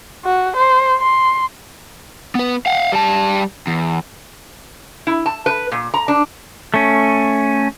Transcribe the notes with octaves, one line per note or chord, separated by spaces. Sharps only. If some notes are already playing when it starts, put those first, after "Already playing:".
F#4
C5
C6
B3 B4
F5 F#5
G3 A5
E2
E4
A5
B4
A#2
A#5
D4
A3 C#4